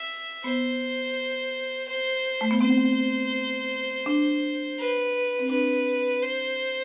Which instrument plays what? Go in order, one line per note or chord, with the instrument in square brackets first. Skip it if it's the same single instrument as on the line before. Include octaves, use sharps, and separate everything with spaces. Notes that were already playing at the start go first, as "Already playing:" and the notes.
Already playing: [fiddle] E5
[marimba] B3 [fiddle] C5
[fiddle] C5
[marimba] A3
B3
[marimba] C4 [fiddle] C5
[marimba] D4
[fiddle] B4
[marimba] C4
[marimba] D4 [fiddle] B4
[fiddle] C5